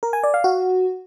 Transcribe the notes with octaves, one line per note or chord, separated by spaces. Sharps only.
A#4
G#5
D5
F5
F#4